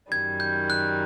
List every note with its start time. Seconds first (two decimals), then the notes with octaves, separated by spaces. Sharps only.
0.11 F#2 D#3 G3 G#6
0.40 G6
0.70 F#6